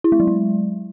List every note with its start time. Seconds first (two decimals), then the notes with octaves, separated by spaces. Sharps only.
0.04 E4
0.12 G#3
0.20 F#3
0.27 G#3